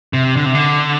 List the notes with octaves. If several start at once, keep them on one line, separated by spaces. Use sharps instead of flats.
C3
D3
C3
D3